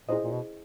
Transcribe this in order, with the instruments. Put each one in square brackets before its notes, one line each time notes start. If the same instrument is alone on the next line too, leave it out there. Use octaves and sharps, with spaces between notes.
[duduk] A#2 [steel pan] E4 G#4 C5 D#5
[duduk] A#2
B2